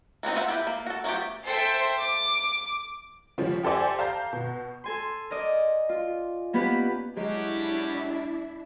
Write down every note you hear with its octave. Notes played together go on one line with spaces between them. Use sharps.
E3 B3 C4 D#4
B3 F4 E5 F#5
E4 G4 B4
A#3
F#4 A4
F3 F#3 A3 B3 G4
A4 C5 E5 G5
D6
C#3 F3 G3 C#4
G4 A4 C5 D5 G#5
F5 A5 A#5 G6 C7
B2
A4 G#5 C6
A#4 D5 D#5
F4
A#3 B3 C#4 G4 B4
F#3 G#3 C#4 D4 E4 F#4 G4